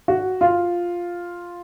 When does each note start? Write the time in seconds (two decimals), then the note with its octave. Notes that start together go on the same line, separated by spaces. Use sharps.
0.08 F#4
0.41 F4